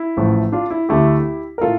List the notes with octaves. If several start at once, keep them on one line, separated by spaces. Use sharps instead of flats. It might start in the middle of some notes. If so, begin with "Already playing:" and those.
Already playing: E4
A1 A2 F3 A3
D4 F4
E4
D2 D3 A3 E4 G4
A#4
A2 F4 A4